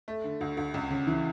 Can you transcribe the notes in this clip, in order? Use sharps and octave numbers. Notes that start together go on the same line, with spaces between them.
A3
D3
D2
D2
C#2
C#3
E3